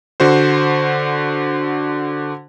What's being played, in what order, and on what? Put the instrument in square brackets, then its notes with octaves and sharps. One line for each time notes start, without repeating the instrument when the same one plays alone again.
[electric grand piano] D3 F#4 C5